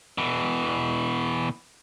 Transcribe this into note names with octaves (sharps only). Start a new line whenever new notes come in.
B2 E3